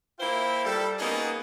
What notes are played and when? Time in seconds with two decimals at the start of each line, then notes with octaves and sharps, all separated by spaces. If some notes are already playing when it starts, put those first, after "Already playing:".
0.19 A#3 E4 F4 C5 E5 G5
0.64 G3 A4
0.99 A#3 B3 C#4 D#4 F#4 G#4